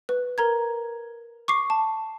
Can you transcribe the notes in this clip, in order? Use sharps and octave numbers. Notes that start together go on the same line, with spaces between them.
B4
A#4 A#5 G#6
C#6 D6 C7
A5